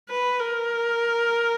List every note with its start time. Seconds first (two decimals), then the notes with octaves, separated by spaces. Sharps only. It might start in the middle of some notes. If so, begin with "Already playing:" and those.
0.10 B4
0.40 A#4